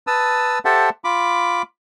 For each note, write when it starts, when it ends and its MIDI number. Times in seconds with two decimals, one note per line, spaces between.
0.07 0.59 71
0.07 0.59 81
0.07 0.59 87
0.07 0.59 88
0.65 0.90 67
0.65 0.90 69
0.65 0.90 72
0.65 0.90 76
0.65 0.90 78
0.65 0.90 81
1.04 1.62 65
1.04 1.62 83
1.04 1.62 86